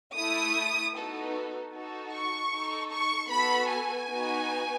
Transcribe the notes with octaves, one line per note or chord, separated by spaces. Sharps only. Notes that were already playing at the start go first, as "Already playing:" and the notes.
A3 E4 A4 D#6
B3 D#4 F#4 A4
D#4 F#4 A4
C#6
D#4 A4
C#6
B3 F#4 A4 B5
G#5
B3 D#4 F#4